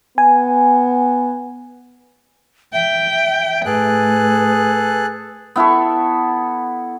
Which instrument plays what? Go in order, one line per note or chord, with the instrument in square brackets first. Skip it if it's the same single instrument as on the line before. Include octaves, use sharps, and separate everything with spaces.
[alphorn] B3 [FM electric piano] G#5
[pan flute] E5 [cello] G5
[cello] A2 [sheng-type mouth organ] G#4 A4 F#6 [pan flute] B4
[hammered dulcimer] B3 E4 A4 C#6